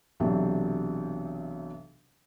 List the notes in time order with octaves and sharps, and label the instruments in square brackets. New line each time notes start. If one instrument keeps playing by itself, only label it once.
[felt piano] B1 C3 E3 F#3 D4 G4